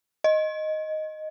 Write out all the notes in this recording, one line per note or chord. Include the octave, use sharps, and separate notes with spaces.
D#5